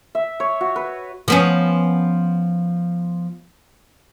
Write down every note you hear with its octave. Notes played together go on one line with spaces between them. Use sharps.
E5
C#5
F#4
B4
F3 B3 C#4